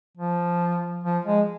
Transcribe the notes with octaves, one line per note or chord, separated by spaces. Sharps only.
F3
F3
G#3